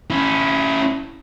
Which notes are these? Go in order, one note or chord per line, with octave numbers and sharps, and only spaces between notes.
C#4 E4